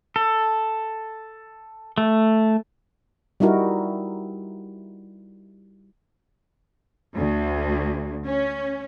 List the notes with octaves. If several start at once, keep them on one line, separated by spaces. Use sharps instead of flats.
A4
A3
G3 D#4 E4 F#4 A#4
D2
C#4